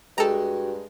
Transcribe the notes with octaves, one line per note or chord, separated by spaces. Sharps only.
G2 G#3 F#4 A4 G5 A#5